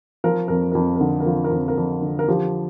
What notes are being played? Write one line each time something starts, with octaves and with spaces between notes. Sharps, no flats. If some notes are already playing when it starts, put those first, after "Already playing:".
F3 A#4
F2 A#4
F2 A#4
D3 A#4
A#4
F3
A#4
F2
A#4
F2
D3
A#4
F3 G4